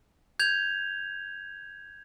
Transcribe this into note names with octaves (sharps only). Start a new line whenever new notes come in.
G6 G#6 F7